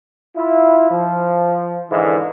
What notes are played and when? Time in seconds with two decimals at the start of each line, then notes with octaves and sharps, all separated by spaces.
0.36 E4 F4
0.90 F3
1.91 G#2 D3 E3